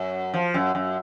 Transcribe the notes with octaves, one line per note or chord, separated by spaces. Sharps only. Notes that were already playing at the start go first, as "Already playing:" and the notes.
Already playing: F#2
F3
F#2
F#2